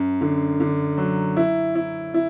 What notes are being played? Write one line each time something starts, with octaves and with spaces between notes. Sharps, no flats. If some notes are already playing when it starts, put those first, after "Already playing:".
Already playing: F#2
D3
D3
F#3
E4
E4
E4